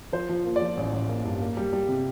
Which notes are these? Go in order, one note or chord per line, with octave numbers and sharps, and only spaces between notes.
F3 C5
F3
A#3
D5
F3
A1
A1
A#3
G2
A#3
G3
G3
C3